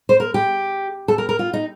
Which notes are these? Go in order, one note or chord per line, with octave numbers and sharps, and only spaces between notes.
C5
A#4
G4
A4
A#4
A#4
F4
D#4